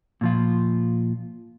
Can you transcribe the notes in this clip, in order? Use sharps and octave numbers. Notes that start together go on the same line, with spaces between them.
A#2 F3 F4